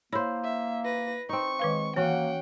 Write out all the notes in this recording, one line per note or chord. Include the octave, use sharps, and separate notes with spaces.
A#3 E4 C5 C#5 B5
E5
B4 A#6
C4 D#4 C#6
D#3 G#3 B4 F5
E3 A#3 C#4 F#4 F#5 G5